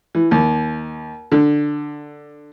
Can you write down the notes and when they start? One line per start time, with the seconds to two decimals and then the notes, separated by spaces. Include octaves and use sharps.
0.15 E3
0.31 D#2
1.32 D3